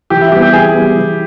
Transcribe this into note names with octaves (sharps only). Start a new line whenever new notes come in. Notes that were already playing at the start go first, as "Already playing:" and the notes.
E3 G4
E4
G3 B3 G4
G4
E3 G#4
G3 B3
E3